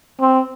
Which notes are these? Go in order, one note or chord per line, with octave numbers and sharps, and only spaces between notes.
C4